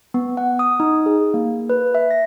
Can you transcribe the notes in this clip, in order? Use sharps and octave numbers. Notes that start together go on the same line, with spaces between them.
B3
F#5
D#6
D#4
G#4
A#3
B4
E5
A#6